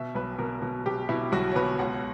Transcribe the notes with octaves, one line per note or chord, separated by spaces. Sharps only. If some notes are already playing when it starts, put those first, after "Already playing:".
Already playing: B2 E5
B1 B4
B2 A#4
B2
B2 G4
B2 E4
B1 F#4
C#5
B2 B4
C#2 F#5